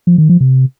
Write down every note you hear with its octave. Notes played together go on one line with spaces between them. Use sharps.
F3
D#3
F3
C3